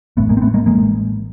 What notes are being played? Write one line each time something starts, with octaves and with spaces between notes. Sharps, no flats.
A1 A2 A3 B3
G#3 A#3
C4
A3 B3
G#3 A#3
A1 A2 G#3 A#3